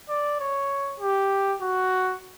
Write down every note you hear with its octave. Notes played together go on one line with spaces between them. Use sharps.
D5
C#5
G4
F#4